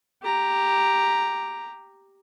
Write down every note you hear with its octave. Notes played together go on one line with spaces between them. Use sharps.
G4 A#5